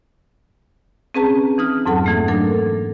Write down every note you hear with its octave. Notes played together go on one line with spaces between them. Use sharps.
C4 C#4 G#4 B4 A5 A#5
E3 D#4 F6
F2 G#2 F#3 A4 F#5 A5
E3 A3 A#3
F#3 D4 A4 A#4